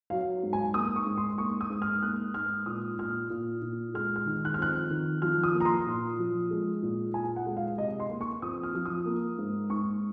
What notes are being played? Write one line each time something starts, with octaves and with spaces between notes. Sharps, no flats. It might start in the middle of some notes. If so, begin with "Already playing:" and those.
F#3 F5
G#2
G#5
A#3 D#6
C#6
G#2
C6
A#3 C#6
D#6
G#2
F6
A#3 F#6
G#2 F6
A#2 D#6
A#2 F6
A#2
A#2
G#3 F6
F6
D#3
F#6
F6
F2 F#6
D#3
F3 F6
D#6
A#3
A#5
C6
A#2
F3
G#3
A#2
A#2 G#5
F#5
G#3
F5
C3 D#5
C6
A#3
C#6
F2 D#6
F6
F3
D#6
A#3
G#2
G#2 C#6